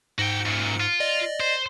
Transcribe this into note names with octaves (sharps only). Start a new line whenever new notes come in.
G#2 F#4 G5 C#7
F#2 A#2
F4
D5 D#5
C5